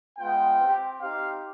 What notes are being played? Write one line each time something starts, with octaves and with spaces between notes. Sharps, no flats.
G#3 B3 F4 G5
C4 G4
C4 D#4 G4 F5